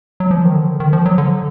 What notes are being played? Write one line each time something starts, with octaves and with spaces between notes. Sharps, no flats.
F#3
F3
D#3
D3
D#3
F3
F#3
D3